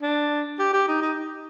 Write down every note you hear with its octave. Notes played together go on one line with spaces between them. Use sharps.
D4
G4
G4
D#4
D#4